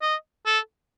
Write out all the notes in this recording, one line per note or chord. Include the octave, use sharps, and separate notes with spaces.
D#5
A4